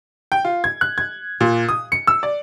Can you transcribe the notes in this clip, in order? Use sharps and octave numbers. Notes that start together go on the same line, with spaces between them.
G5
F4
G#6
F#6
G#6
A#2
D#6
C#7
E6
D5